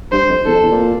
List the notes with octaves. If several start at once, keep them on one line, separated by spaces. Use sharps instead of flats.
G2 C5
F2
E2 A4
F2
E2
A#2